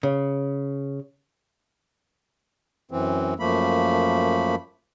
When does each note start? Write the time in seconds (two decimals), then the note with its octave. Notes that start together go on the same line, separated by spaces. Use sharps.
0.03 C#3
2.91 F#2 E3 C4
3.40 F#2 F3 A3 A#3 B5